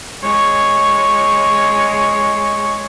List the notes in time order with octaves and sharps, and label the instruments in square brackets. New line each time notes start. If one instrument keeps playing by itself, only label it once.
[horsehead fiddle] G#3 C#5